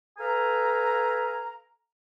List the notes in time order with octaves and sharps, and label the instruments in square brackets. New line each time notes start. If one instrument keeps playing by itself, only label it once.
[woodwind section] A4 B4 F5 G#5 A#5